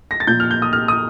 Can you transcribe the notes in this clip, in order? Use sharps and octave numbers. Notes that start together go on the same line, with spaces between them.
A#6
A6
A#2 F3 G6
F6
G6
D#6
F6
D#6